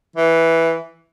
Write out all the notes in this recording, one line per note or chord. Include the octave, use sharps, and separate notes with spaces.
E3